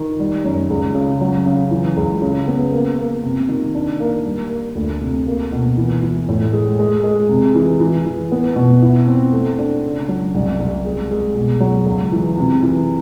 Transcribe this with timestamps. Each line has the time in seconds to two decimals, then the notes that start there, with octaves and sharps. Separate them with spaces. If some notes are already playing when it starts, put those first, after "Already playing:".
Already playing: D#3
0.20 G3
0.44 F#2
0.70 C#2
0.95 C#3
1.21 F#3
1.46 C#3
1.71 E3
1.97 C#2
2.22 C#3
2.47 B3
2.72 A#3
2.99 A#3
3.23 C3
3.49 D#3
3.75 D4
4.00 A#3
4.26 G3
4.50 A#3
4.75 D2
5.01 C3
5.27 A#3
5.52 B2
5.77 E3
6.02 E3
6.29 A2
6.53 G#3
6.79 G#3
7.04 G#3
7.29 C3
7.55 E3
7.80 E3
8.05 E3
8.32 B3
8.56 B2
8.82 E4
9.07 C4
9.32 A3
9.59 D4
9.83 C#3
10.09 F#3
10.35 C2
10.59 C2
10.85 G#3
11.11 G#3
11.35 B2
11.60 F#3
11.86 C#2
12.12 E3
12.38 C3
12.62 E3